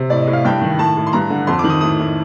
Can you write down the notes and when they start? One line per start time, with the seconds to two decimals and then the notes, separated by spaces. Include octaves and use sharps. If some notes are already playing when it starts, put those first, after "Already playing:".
Already playing: C3
0.10 A2 D5
0.22 A2 D#5
0.33 F5
0.44 G2 G5
0.61 D#3
0.78 A2 A5
0.97 A2
1.07 C6
1.13 G2 A#5
1.30 D3
1.47 F2 C6
1.59 D#3 D6
1.70 D#6
1.81 A2 D#6
1.99 A2